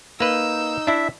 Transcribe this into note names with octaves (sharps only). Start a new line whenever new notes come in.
A#3 D#4 B4 E6 G6
D4 E4 E5